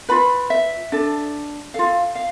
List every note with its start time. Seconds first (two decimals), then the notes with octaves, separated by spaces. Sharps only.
0.09 F4 B4 B5
0.50 E5
0.92 D4 A4
1.74 F4 A4 F5
2.15 F5